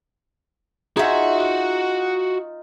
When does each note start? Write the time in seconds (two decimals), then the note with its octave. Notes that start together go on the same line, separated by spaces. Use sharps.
0.97 D#4 F4 F#4 G#4 E5 F#5